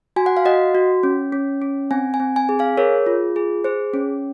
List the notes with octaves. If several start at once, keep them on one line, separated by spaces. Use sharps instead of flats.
F#4 G#5
F#5
F5
F#4 D#5 F#5
F#4
C#4
C#4
C#4
C4 G#5
G#5
C4
G#5
G#4
F5 G#5
G#4 A#4 C#5
F4
G#4
G#4 C5
C#4